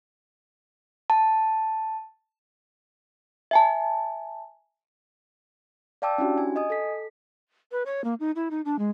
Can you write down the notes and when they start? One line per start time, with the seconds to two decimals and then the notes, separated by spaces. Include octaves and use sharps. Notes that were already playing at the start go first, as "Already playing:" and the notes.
1.10 A5
3.51 E5 G#5 A5
6.02 D5 F5 G5 A5 D6 E6
6.18 C#4 D4 E4 F#4 G4
6.38 G#5
6.56 D#5 G#5 D#6
6.70 A4 B6
7.72 B4
7.85 C#5
8.04 A#3
8.20 D#4
8.36 E4
8.51 D#4
8.65 D4
8.79 G#3